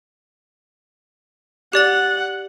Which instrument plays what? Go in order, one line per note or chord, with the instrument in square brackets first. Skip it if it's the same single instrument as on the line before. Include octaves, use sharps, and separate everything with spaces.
[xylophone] G4 D5 A6 [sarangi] F#5